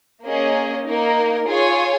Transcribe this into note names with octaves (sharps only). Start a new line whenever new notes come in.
A#3 C#4 G#4 D#5
A#3 D#4 A#4
F4 G#4 C#5 G#5